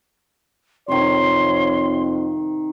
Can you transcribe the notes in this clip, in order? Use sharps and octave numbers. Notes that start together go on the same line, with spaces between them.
F2 C3 D#3 C#5 C6